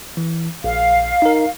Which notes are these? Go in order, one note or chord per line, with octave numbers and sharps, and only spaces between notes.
E3
A#1 F5
D#4 A#4